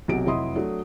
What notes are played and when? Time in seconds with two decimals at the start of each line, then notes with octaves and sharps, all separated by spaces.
0.08 B1 C3 F#3 D7
0.26 F1 F#3 E4 D#5 C6 D#6
0.55 F#3 A3 D4